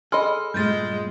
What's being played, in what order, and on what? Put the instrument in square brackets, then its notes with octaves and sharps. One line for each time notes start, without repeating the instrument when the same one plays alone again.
[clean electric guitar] G#4 [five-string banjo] A4 D#5 [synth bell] B5 C6 F6
[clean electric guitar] G2 A#2 [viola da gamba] G#3 [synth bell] G6 A6